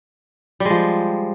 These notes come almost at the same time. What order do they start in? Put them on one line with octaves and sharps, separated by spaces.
G3 G#3 F3